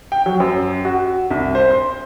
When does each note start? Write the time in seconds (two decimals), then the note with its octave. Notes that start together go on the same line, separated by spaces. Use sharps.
0.12 G5
0.26 F#3
0.40 F#2
0.85 F#4
1.31 C2
1.55 C5
1.71 C6